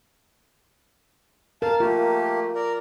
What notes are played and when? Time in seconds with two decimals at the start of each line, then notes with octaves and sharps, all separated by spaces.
1.62 A#4 F5 A5
1.80 A3 A#3 F4 G4
2.55 A#4 D5